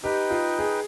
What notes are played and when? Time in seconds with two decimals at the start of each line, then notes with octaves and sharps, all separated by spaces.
0.03 D#4 G4 B4 D#5 G5
0.31 F4
0.59 G#4